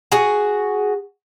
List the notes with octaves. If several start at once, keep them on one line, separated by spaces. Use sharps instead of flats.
F#4 G#4